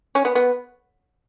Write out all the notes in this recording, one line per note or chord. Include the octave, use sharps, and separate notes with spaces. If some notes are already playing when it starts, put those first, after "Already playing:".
C#4
B3
B3